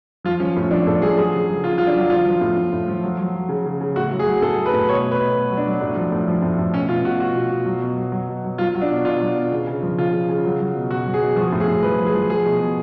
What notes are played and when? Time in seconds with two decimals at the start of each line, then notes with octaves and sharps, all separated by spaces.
0.24 F3 F4
0.40 F3 C#4
0.56 A2 C#4
0.71 F3 D4
0.86 A2 A4
1.02 F3 G#4
1.17 F#3 G#4
1.34 C#3
1.49 F#3
1.64 C#3 F4
1.78 F#3 F4
1.87 D4
1.95 F#3
2.10 F3 F4
2.25 F3
2.41 A2
2.57 A2
2.73 A2
2.88 F3
3.03 F#3
3.18 F#3
3.34 F#3
3.49 C#3
3.65 C#3
3.80 C#3
3.96 A2 F#4
4.11 F#3
4.19 G#4
4.26 F#3
4.42 A2 A4
4.58 F#3
4.66 B4
4.73 A2
4.88 B2 C#5
5.04 B2
5.12 B4
5.19 B2
5.35 B2
5.50 F#3
5.57 D4
5.66 F#3
5.81 A2
5.96 F3
6.12 A2
6.28 F3
6.42 A2
6.58 A2
6.74 B2 C#4
6.89 B2 F4
7.05 B2 F#4
7.20 B2 F#4
7.35 B2
7.50 B2
7.66 F#3
7.82 B2
7.97 F#3
8.12 F#3
8.29 B2
8.44 F#3
8.58 F#3 F4
8.75 F#3
8.82 D4
8.90 B2
9.05 B2 F4
9.21 F#3
9.36 B2
9.52 C#3
9.67 C#3
9.82 F3
9.98 C#3 F4
10.13 C#3
10.29 C#3
10.45 F#3
10.59 F#3
10.75 B2
10.90 B2 F#4
11.06 F#3
11.14 G#4
11.22 B2
11.36 F3 F#4
11.52 A2
11.60 G#4
11.68 A2
11.83 F3 B4
11.99 F3
12.06 G#4
12.14 F3
12.29 F#3 G#4
12.45 B2
12.60 B2